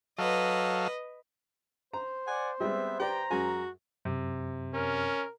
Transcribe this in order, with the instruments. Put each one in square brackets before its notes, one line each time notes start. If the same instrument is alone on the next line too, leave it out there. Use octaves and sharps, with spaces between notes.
[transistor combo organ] F#3 A4 F5 [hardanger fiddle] B4 D#5
[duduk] C5 [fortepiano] A#5
[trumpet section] D5 F#5 [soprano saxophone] G#5
[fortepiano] G3 G#3 [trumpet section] B3 C4 [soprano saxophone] E5
[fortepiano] G4 B4 D5 [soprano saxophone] G5 [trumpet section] A#5
[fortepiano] F#2 G#3 G#5 [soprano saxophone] F#4
[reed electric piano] F#2 [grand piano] C3
[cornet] C#4 [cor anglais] A#4